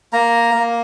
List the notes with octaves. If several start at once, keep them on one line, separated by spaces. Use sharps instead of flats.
A#3 A#5
A#3